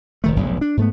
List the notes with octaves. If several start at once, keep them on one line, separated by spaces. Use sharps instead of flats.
F1 D#3 A3
F1 B1 G#2
D4
G#2 A3 B3